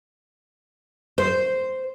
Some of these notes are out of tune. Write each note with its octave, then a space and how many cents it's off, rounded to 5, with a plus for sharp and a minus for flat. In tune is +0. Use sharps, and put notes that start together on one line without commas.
C5 -5